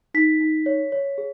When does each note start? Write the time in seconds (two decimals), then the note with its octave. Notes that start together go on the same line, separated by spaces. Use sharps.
0.14 D#4 B6
0.41 D#4
0.66 C#5
0.92 C#5
1.18 G#4